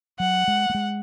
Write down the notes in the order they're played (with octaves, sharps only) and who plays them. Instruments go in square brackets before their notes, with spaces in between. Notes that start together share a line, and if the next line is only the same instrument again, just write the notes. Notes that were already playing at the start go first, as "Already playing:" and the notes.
[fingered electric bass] F#3 [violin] F#5
[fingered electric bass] G#3
A3
G#3